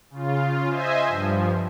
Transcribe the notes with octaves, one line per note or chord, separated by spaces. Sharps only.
C#3 F4
C5 D#5 E5 G#5
G2 F3